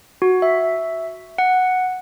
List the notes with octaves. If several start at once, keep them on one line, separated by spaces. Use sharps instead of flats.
F#4
E5
F#5